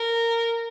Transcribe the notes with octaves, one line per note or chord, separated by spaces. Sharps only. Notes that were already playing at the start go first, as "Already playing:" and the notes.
Already playing: A#4